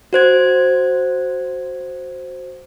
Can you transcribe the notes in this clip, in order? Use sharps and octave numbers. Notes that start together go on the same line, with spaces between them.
F#4 C5 G#6